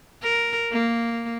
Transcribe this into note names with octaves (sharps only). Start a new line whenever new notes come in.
A#4
A#3